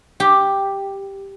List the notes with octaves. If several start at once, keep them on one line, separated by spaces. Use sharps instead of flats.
G4